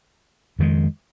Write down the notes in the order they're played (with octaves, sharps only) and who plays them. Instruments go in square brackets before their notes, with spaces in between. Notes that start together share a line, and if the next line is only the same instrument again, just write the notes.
[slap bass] F2 D#3 G#3